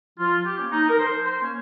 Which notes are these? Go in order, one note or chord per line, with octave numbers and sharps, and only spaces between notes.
F3 F4
G4
A#3 C#4
D#4
A#4
F3 C5
C5
A#3 C#4